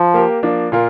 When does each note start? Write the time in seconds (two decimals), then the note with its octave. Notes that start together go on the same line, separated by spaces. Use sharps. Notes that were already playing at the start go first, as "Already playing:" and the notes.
Already playing: F3
0.14 A#3 G4 A#4
0.43 F3 A#3 D4
0.72 A#2 A#3 F4 A#4